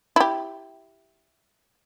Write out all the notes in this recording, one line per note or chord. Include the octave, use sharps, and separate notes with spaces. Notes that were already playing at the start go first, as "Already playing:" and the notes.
E4 G4